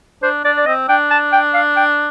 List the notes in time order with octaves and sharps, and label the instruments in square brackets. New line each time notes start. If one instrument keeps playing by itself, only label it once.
[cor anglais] D4 [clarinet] C5
[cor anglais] D4 [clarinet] D5
[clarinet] D5
[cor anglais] C4 [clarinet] D#5
[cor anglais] D4 [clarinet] G5
[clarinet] A5
G5
F5
G5